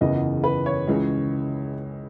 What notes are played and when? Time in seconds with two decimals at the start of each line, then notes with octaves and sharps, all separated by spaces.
0.01 F#1 E2 C#3 E3 B3 D#5
0.44 B4
0.66 C#5
0.87 C#2 C#3 E3 G#3